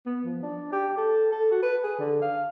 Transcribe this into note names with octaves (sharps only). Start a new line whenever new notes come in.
B3
F3
D4
G4
A4
A4
F#4
B4
G#4
D3
F5